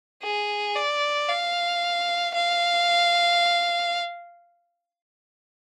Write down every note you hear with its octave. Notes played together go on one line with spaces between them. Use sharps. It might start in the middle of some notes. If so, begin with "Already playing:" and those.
G#4
D5
F5
F5